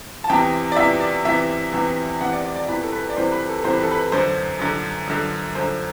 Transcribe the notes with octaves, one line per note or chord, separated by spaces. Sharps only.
A5
E2 C3 E3 G5
D5
E2 C3 E3 E5
D5
E2 C3 E3 E5
E2 C3 E3
E2 C3 E3 F#5
D5
D5
D5
E2 C3 E3 B4
A4
B4
D5
E2 C3 E3 C5
B4
A4
E2 C3 E3 C5
B4
A4
B4
F#2 D3 C5
F#2 D3
F#2 D3
F#2 D3 C5